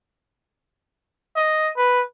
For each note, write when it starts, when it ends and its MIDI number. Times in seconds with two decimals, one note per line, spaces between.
1.36 1.70 75
1.77 2.02 71